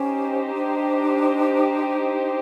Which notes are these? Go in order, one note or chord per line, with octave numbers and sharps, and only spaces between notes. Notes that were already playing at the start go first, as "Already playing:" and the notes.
Already playing: C#4 D#4 G4 C5
D4